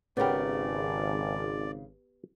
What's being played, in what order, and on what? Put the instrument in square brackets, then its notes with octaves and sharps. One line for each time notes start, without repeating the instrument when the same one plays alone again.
[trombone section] G#1 [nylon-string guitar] C#3 A#4 [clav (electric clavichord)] B3 G4 [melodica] D5